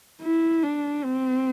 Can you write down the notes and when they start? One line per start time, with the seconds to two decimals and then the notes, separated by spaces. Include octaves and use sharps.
0.22 E4
0.63 D4
1.04 C4